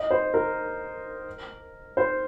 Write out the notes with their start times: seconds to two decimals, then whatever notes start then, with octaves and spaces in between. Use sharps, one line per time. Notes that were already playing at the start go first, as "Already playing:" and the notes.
Already playing: D#5
0.11 C5
0.34 A#4
1.97 C5